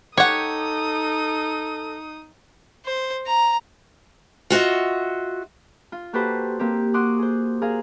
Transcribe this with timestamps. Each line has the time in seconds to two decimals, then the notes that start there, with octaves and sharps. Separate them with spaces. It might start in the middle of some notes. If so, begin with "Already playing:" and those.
0.17 D#4 G4 A4 C#5 F#5 D#6
2.86 C5
3.27 A#5
4.50 F4 F#4 D#5 E5
5.92 F4
6.13 A#3 F#4 G4 A4 B4 C5
6.59 A#3 C4 G4
6.94 F#4 F#5 C6 D6 D#6
7.19 G#4 C5
7.62 G#4 A#4 F5